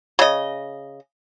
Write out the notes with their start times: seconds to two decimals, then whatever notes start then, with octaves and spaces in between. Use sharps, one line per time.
0.19 C#3 D#5